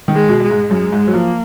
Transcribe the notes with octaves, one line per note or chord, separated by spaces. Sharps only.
D#3
G#3
B2
G#3
G#2
F#2 G#3
G#2
F#3
F3 A#3